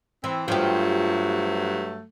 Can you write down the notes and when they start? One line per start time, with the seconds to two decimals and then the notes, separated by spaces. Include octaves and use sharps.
0.24 E3 C4
0.48 G2 F3 F#3 A3 G4